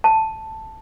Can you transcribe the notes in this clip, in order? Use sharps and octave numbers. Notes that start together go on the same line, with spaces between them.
A5